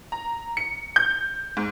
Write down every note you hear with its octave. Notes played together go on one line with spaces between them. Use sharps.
A#5
C#7
G6
G#2